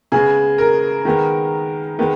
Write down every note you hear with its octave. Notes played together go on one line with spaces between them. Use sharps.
C#3 G#3 B3 G#4
A#4
D#3 G#3 B3
D#3 G#3 B3